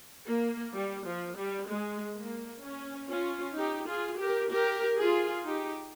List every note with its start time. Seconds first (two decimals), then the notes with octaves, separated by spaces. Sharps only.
0.28 A#3
0.75 G3
1.06 F3
1.38 G3
1.68 G#3
2.17 A#3
2.63 C#4
3.10 C#4 F4
3.57 D#4 G4
3.89 F4 G#4
4.20 G4 A#4
4.52 G4 A#4
4.99 F4 G#4
5.46 D#4 G4